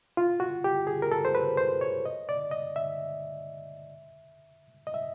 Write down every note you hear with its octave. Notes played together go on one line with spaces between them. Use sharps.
F4
F#4
G4
G#4
A#4
A4
C5
B4
C5
C#5
D#5
D5
D#5
E5
D#5
E5